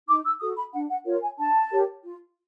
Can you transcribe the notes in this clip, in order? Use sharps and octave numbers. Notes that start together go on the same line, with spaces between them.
D#4 D6
E6
F#4 A4 D#6
B5
D4 F#5
F#5
F4 A#4 C#5
G#5
D4 A5
G4 A#4 C#5
F4